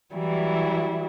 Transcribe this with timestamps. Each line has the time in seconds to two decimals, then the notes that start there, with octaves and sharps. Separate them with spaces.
0.15 E3 F#3 G3 E4